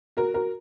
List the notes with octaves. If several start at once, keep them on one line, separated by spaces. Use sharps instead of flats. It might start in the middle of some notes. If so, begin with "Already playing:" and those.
F#4 A#4
F#4 A#4